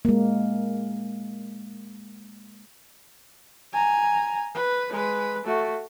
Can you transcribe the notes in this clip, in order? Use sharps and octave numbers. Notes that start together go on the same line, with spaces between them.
G#3 A#3
G#5 A#5
B4
G#3 B4
A3 F#4